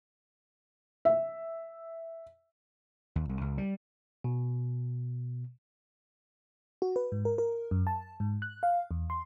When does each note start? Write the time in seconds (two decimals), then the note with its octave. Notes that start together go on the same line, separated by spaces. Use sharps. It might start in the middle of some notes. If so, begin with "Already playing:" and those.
1.05 E5
3.16 D#2
3.29 C2
3.41 C#2
3.58 G3
4.24 B2
6.82 F#4
6.96 B4
7.12 G#2
7.25 A#4
7.38 A#4
7.71 F#2
7.87 A5
8.20 G#2
8.42 F#6
8.63 F5
8.91 E2
9.10 C6